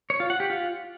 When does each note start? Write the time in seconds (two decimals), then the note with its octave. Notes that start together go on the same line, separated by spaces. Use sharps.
0.10 C#5
0.20 F4
0.30 F#5
0.40 G4
0.50 F4